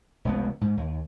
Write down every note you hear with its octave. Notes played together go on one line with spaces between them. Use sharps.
F1 C#2 B3
G#2
D#2